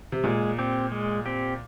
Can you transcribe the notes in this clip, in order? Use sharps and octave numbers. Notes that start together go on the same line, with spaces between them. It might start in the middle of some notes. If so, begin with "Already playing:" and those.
C3
A#2 G#3
C4 G4
G#3
C4 G4